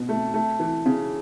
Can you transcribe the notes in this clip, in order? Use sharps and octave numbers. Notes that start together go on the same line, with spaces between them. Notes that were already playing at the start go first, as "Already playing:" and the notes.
Already playing: B2
A3
A3
E3
C#3